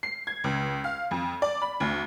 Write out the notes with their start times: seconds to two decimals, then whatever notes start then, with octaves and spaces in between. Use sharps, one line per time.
0.03 C7
0.27 G#6
0.44 C#2
0.84 F5
1.11 F2
1.42 D5
1.62 B5
1.80 D2